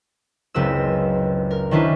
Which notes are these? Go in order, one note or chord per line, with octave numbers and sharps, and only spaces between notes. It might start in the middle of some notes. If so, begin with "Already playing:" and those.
F#1 C#2 C4 B4 E6
A#4
D#3 C#4 D4 E4 B4 C5